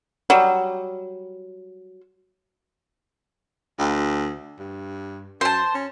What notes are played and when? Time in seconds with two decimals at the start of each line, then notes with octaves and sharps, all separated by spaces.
0.30 F#3 G3
3.79 D2
4.59 G2
5.41 F#2 C5 A5
5.74 C#4